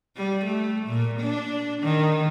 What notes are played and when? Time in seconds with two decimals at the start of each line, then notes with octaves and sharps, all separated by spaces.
0.17 G3
0.45 A3
0.87 A#2
1.20 D4
1.83 D#3